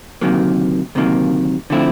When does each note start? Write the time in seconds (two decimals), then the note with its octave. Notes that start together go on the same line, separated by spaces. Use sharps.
0.21 D2 C3 D#3 F#3 A#3
0.95 D2 C3 D#3 F#3 A#3
1.70 D3 F3 A3 C4 E4